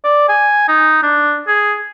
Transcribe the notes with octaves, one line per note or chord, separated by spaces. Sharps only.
D5
G#5
D#4
D4
G#4